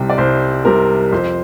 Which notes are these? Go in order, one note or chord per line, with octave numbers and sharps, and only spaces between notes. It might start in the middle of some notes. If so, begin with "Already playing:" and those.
Already playing: C2 C3 G3 G5
D5
C2 C5
C3 G3 A#4
F2 C5